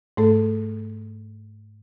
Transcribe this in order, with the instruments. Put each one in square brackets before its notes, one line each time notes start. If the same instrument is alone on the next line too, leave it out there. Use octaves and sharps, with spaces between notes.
[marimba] G#2 A3 A4